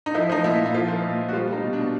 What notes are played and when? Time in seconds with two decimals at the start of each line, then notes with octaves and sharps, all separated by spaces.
0.06 D#4
0.15 F3 E4
0.29 F3 D#4
0.44 A#2 E4
0.59 A#2
0.66 E4
0.74 F3 F4
0.88 F3
1.03 A#2
1.18 A#2
1.28 F#4
1.33 G3 F4
1.48 G3 D#4
1.63 B2
1.73 D4
1.78 B2